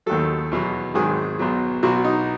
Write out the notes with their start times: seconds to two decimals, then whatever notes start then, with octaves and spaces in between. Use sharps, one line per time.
0.06 D#2 D#3 F#3 A4
0.51 E2 B2 F#3
0.94 G#1 G#2 D#3 F#3 G#4
1.39 B1 B2 F#3
1.83 B1 B2 F#3 F#4
2.05 D#4